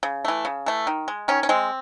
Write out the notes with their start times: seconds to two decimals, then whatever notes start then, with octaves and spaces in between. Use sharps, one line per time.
0.03 C#3
0.25 E3 A3
0.45 C#3
0.66 E3 A3
0.87 D#3
1.08 G#3
1.28 D#3 C#4
1.43 C#4
1.49 G#3 C4